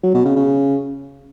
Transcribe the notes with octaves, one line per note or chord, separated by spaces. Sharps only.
F#3
B2
C#3
C#3